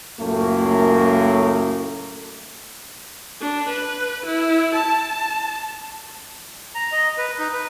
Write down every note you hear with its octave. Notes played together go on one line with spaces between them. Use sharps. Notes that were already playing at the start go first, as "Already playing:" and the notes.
C#2 F#2 A2 A3 A#3
D4
B4
E4
A5
A#5
D#5
B4
D#4
B4